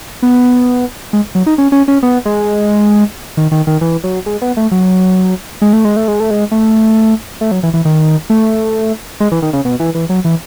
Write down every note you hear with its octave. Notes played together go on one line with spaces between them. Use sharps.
B3
G#3
F#3
D#4
C#4
C#4
C#4
B3
G#3
D#3
D#3
D#3
E3
F#3
G#3
B3
A3
F#3
G#3
A3
G#3
A3
G#3
A3
G#3
A3
A3
F#3
E3
E3
D#3
A3
G#3
E3
D#3
C#3
B2
E3
E3
F#3
E3